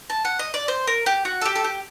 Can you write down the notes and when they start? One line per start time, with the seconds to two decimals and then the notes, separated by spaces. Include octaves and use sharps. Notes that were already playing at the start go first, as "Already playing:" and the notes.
0.10 A5
0.25 F#5
0.39 D#5
0.54 D5
0.68 C5
0.87 A#4
1.06 G4
1.25 F#4
1.41 A4
1.46 G4
1.56 A4
1.64 G4